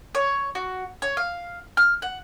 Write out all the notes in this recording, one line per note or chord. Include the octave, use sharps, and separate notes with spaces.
C#5
F#4
C#5
F5
F6
F#5